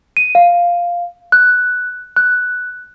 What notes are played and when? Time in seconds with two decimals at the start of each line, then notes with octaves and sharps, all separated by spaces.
0.17 D#7
0.35 F5
1.32 F#6
2.16 F#6